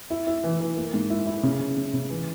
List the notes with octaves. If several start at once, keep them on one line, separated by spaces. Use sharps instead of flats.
E4
E4
E3
E3
A#3
G#2
E4
E4
C#3
C#3
C#3
C#3
E3